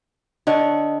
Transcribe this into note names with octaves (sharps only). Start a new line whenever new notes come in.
D3 D4 C#5 D#5